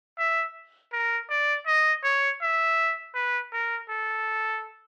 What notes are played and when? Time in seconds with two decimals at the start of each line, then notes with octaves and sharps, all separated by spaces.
0.18 E5
0.93 A#4
1.30 D5
1.67 D#5
2.04 C#5
2.42 E5
3.15 B4
3.53 A#4
3.89 A4